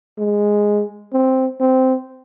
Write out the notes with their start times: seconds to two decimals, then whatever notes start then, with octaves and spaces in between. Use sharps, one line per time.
0.18 G#3
1.13 C4
1.61 C4